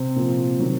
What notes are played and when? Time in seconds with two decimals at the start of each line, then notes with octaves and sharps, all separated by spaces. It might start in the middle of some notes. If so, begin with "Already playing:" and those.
Already playing: C3 C4
0.16 A#2 F3
0.60 D#3 F#3